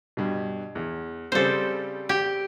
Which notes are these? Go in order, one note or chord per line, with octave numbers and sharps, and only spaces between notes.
G2 B2
E2
C#3 G3 C4 A4 C5
G4